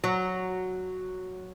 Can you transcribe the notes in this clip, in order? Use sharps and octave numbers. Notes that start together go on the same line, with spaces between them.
F#3